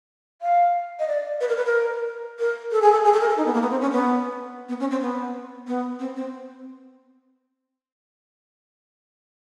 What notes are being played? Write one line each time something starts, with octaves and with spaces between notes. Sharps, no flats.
F5
D#5
D5
B4
A#4
B4
A#4
A#4
A4
G#4
A4
G#4
A4
A#4
A4
D#4
B3
A#3
B3
C4
C#4
B3
B3
C#4
C4
B3
B3
C4
C4